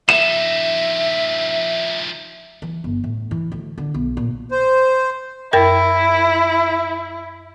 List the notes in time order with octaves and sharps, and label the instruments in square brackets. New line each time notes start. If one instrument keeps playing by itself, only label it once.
[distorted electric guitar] F3 D#4 [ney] E5 [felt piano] E7
[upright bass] E3
G1
A2
E3
D2
D3
B1
A#2
[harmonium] C5
[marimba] F#2 A#4 A#6 [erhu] E4